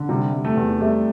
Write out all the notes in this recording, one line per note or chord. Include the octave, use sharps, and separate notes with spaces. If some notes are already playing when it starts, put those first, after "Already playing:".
Already playing: D3
C3 G3
G3
A3
E2
G3 A3